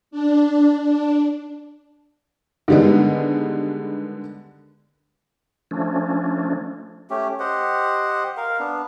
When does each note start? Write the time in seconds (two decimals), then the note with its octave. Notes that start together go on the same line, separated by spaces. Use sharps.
0.11 D4
0.82 D4
2.68 D3 D#3 G3 G#3 B3
5.71 F3 A3 C#4 D4
7.10 A3 C#4 G4
7.40 G4 C5 D#5 F#5
8.37 A#4 F5
8.60 B3 D4